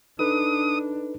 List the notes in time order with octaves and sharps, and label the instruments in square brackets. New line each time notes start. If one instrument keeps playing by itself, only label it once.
[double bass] D4 [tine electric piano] D#4 A4 B4 [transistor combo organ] D#6